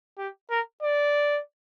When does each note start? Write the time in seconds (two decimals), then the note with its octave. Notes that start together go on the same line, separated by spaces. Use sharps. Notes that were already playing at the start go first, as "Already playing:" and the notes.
0.18 G4
0.50 A#4
0.82 D5